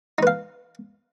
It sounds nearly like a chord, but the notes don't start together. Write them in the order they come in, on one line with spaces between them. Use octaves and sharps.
D#4 B4 F5